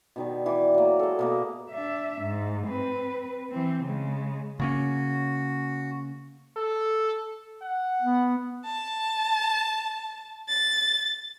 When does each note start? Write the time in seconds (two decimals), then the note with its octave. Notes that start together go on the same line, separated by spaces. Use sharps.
0.16 B2 D#3 G3
0.46 E3 D5
0.74 F#3 A#3
0.99 G#3 A4
1.19 B2 A#3 D#5
1.71 D4 E5
2.21 G#2
2.67 C4 B4
3.50 E3 C4
3.84 C#3 G#3
4.60 C#3 A#3 C#4 F#4
6.57 A4
7.62 F#5
8.02 B3
8.65 A5
10.49 A6